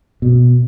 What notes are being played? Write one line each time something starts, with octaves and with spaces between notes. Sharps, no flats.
B2